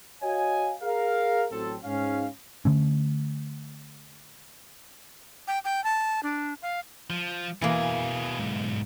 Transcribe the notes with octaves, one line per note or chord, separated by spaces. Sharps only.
F#4 C#5 D#5 F5 G#5
G#4 A#4 F5
A1 F#3 C4 A4
G#2 C#4 F5
D3 A3 C#4
G5
G5
A5
D4
F5
F3
B2 E3 A#3 G#4
B1 G#2